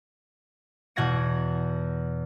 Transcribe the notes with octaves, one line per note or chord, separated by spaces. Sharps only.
E2 B2 F#5 G#6 A#6 D7